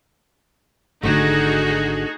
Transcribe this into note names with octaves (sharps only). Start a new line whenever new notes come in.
G#1 D3 A3 D4 D#4 F#4 G#4